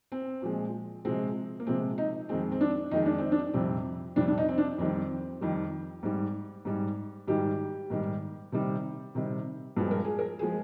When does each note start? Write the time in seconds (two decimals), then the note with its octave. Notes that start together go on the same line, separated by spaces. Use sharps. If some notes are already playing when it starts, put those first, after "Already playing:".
0.12 C4
0.42 A#2 F3 G#3
1.05 C3 F3 G#3 C4
1.60 A#3
1.67 C3 F3 G#3 C4
1.98 D#4
2.29 F2 D#3 G#3 C4
2.52 C4
2.61 D4
2.91 F2 D#3 G#3 D#4
3.06 D4
3.18 C4
3.32 D4
3.54 F2 C3 G3 C4
4.16 F2 C3 G3 D4
4.28 D4
4.38 D#4
4.48 C4
4.58 D4
4.78 F2 D#3 G3 C4
5.41 F2 D#3 G3
6.03 G#2 G3
6.65 G#2 G3
7.28 G#2 D#3 G3 G4
7.90 G#2 D#3 G3
8.52 C3 D#3 G3
9.15 C3 D#3 G3
9.77 G2 F3 G#3
9.91 A#4
10.05 G#4
10.19 A#4
10.39 F3 G#3 G#4